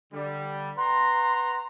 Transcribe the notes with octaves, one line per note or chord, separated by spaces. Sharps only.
D3 G3
B4 F#5 A#5 C6